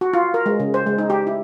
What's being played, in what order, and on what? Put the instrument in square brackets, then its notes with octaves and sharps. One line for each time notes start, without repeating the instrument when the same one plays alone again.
[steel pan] F#4
F4
A#4
G#3
C#3
C5
G#3
D#4
G4
E4